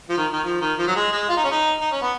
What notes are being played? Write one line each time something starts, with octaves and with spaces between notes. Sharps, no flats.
F3
D#3
D#3
F3
D#3
F3
F#3
G#3
G#3
F4
D#4
C#4
D#4
D#4
C#4
B3